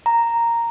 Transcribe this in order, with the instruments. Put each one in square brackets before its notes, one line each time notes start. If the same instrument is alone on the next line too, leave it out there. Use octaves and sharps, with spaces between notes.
[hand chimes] A#5